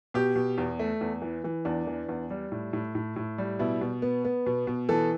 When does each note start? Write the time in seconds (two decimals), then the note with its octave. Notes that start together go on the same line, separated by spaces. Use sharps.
0.14 B2 G4
0.36 B2
0.58 E2
0.79 A3
1.01 E2
1.22 E3
1.44 E3
1.65 E2 D4
1.87 E3
2.09 E2
2.30 G3
2.52 A2
2.73 A2
2.95 A2
3.16 A2
3.38 G3
3.59 B2 E4
3.81 B2
4.02 B3
4.25 B3
4.46 B2
4.67 B2
4.89 E3 A4